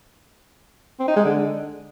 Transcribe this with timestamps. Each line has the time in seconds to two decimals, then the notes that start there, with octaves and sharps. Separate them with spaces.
1.00 C4
1.08 D#4
1.17 G#3
1.25 D3